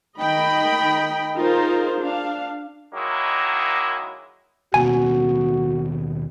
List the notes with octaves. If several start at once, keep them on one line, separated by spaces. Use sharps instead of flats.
D#3 D#5 G5 B5
D#4 F4 G#4 A#4 C5
D4 F5
D#3 F#3 G#3 A#3 E4
D#2 B2 F#4 G#5